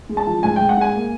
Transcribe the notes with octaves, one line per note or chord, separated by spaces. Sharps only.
G#3
A5
F3
G#2 G#5
G5
G#2
F#5
G#3 G#5
A#3